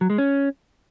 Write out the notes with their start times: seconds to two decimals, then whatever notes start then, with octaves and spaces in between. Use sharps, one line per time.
0.01 F#3
0.10 G#3
0.18 C#4